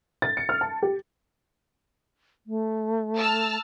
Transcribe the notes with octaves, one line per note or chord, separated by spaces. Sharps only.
A6
C#7
F6
A5
G4
A3
A5 E6 F6